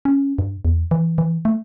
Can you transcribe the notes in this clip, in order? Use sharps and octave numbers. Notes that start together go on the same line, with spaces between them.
C#4
G2
E2
E3
E3
A3